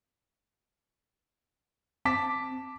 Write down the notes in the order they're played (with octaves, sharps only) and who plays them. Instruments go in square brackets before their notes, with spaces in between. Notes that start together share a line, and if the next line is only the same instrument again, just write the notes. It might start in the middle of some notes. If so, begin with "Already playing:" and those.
[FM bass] C4 [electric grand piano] A5 D6 B6